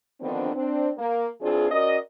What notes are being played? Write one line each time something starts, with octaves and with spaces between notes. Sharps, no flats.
D3 D#3 F3 B3 C4 D4
C4 D4
A#3
E3 C4 D4 F4 G#4
C#4 F#4 A#4 D5 D#5